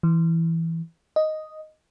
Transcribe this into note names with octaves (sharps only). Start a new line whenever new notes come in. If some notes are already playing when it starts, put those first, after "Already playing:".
E3
D#5